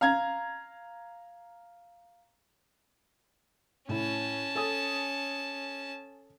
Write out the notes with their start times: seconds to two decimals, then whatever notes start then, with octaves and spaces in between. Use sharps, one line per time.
0.01 F5 A#5 G#6
3.89 A2 C#4 E4 A5
4.55 A4 G#5 D#6